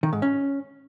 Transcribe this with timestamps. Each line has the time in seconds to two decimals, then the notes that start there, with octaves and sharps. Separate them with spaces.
0.03 D#3
0.13 G#2
0.22 C#4